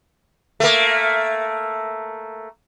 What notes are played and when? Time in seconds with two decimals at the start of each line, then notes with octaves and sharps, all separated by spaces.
0.60 A3 A#3